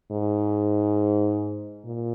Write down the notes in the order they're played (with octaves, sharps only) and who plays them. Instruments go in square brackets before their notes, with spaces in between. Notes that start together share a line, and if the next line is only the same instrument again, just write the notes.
[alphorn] G#2
A#2